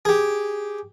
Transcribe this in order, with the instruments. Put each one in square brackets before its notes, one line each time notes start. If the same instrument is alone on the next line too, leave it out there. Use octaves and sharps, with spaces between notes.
[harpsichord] G4 G#4